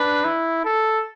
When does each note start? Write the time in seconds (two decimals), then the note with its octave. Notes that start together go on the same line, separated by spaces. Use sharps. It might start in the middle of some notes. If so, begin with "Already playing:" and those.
Already playing: D4 B4
0.25 E4
0.65 A4